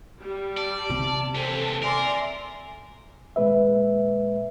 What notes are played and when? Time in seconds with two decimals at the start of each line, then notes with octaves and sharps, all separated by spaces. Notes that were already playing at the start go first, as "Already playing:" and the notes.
0.19 G3
0.57 D5 A5
0.90 C3
1.35 D#2 E3 C4 A4
1.83 A#4 D5 E5 G#5 C6
3.36 D#2 A#2 G#3 B4 E5